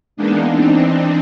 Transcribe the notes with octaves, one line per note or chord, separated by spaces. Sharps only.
E3 G#3 A#3 B3 D4 D#4
E3 C4 D4 D#4